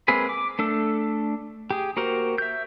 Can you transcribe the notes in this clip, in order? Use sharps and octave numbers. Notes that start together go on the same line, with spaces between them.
G#3 A#3 C4 G#4 B4
D6
A3 D4 A4
G4 G#4
A#3 F#4 G4 A#4 C5
E5 G6